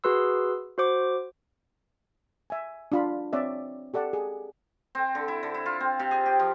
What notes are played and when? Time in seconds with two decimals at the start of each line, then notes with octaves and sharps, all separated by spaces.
0.04 F#4 G#4 B4 C6 E6
0.78 F#4 C5 D6
2.50 E5 G#5
2.92 D4 F4 B5
3.33 C4 C#5 D5 E5
3.94 G4 A4 D5 F#5 A5
4.13 G#4
4.95 C4
5.15 D3
5.28 E4
5.43 D3
5.54 E4
5.66 F4
5.80 C4
5.99 C3
6.11 G#4
6.26 G4
6.39 F3